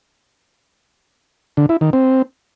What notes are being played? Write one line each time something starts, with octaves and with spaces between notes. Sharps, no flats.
D3
E4
D#3
C4